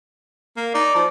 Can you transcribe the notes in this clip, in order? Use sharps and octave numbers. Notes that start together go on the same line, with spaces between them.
A#3
D#4 D5
F3